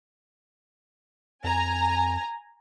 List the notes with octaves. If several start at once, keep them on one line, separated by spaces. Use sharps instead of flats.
F2 G#5 A#5